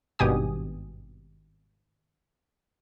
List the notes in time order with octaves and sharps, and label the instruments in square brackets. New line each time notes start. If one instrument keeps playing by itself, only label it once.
[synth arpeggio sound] G#1 G2 B2 G4 G#5 D#6